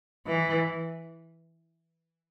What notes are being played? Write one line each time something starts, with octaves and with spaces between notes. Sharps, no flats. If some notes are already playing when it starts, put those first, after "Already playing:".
E3